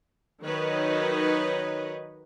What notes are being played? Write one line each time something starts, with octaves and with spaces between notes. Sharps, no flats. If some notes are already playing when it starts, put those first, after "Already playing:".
D#3 F#3 D#4 B4 C#5 D#5